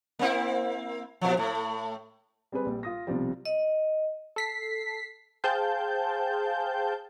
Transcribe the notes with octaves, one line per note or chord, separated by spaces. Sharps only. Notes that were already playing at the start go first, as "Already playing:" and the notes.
A#3 C4 E4
A#2 F3
A2 A3
G3 C4 G#4 B4
A#1 G3
F4 D#6 A#6
B1 C3 F3 G3
D#5
A4 B6 C7
G#4 C5 F5 G5 A5 G6